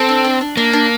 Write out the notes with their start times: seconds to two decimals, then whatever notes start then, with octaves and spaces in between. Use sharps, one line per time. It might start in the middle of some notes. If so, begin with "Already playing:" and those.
Already playing: C4 A4
0.09 D4
0.24 D4
0.41 D4
0.57 A#3 D4
0.73 D4